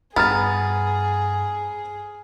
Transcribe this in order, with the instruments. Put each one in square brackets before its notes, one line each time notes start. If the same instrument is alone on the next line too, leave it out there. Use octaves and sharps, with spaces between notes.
[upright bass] G2 [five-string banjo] B3 [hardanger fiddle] G#4 [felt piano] A#5 F6 A6